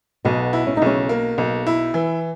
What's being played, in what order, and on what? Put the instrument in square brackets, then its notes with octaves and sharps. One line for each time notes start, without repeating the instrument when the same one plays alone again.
[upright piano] B1 [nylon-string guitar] B2 B3
[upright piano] E4
[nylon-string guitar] C#4
D#4
[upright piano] B1 [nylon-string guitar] C#3 C#4
[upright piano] A#3
B1
E4
E3